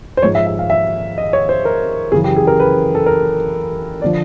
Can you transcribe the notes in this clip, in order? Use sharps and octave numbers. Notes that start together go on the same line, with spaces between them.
C5
G#2 F3 C#5
E5
E5
F5
E5
D#5
C#5
C5
A#4
F#2 C#3 E3 G#4
G4
G#4
A#4
B4
A4
A#4
D3 F3 D5